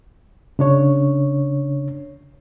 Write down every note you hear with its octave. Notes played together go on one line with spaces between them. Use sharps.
C#3 D4 C#5